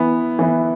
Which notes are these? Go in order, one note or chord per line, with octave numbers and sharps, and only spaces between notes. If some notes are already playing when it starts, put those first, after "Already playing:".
Already playing: E3 B3 E4
E3 B3 E4